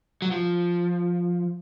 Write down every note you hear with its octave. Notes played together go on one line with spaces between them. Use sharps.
F#3
F3